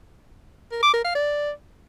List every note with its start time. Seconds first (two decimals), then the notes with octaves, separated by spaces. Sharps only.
0.72 A#4
0.83 D6
0.93 A#4
1.04 F5
1.15 D5